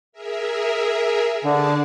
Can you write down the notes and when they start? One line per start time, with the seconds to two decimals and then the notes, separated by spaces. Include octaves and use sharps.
0.12 G#4 A#4 E5
1.44 D3 G#4 D5 A5